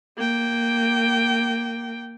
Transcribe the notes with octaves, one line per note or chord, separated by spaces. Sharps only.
A#3 G5